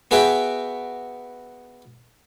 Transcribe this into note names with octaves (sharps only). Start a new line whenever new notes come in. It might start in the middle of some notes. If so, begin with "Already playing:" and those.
B3 F#4 G#4 B4 E5 G5